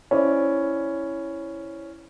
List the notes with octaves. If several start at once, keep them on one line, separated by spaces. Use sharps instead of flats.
C#4 E4 C5 D5